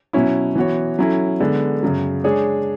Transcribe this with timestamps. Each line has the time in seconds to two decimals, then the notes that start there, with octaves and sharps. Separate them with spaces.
0.13 B2 F#3 C#4 E4
0.55 E3 B3 F#4 C#5
0.99 F#3 C#4 E4 A4
1.40 D3 G#3 B3
1.83 F#2 C#3 F#3
2.24 G#3 D4 G#4 C#5